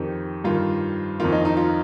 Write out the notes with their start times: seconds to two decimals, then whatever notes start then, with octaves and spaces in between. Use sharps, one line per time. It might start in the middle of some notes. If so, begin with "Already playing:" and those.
Already playing: F2 D#3 G4
0.44 G2 D#3 F4
1.20 F2 D#3 F4
1.32 D#4
1.45 D#4
1.57 F4